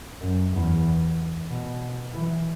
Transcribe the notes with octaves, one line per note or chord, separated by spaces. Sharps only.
F#2
E2
B2
E3